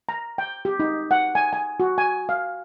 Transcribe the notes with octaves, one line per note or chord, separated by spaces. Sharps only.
A#5
G5
G4
D#4
F#5
G#5
G#5
F#4
G#5
F5